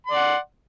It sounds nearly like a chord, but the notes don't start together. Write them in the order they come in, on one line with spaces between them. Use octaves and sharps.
C6 D5 F#5